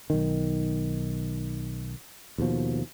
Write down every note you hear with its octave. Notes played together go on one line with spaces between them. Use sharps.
B1 D#3
D#2 B2 F3